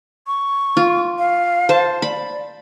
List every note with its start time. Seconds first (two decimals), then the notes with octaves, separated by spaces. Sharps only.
0.27 C#6
0.77 F4
1.19 F5
1.69 C5 A5
2.02 D5 B5